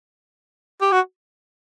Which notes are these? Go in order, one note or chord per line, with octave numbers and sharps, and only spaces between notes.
G4
F#4